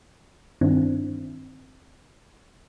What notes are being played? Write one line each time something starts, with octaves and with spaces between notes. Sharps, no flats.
G2 D#3 C4 D4 E4